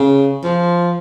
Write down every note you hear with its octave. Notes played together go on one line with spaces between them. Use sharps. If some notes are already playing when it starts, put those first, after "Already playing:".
Already playing: C#3
F3